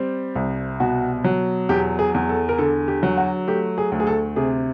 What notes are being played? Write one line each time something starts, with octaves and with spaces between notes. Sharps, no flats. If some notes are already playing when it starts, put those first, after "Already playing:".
Already playing: G3 C4
C2
B2 F#4
F#3
E2 G4
G#4
E2
A4
A#4
D3 A4
G4
F#3
F#4
A3 G4
G#4
D2
G#4
A4
C3 G#4